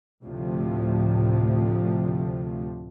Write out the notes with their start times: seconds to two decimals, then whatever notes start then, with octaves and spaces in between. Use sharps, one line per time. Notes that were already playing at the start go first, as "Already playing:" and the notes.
0.24 D2 A2 C3 F3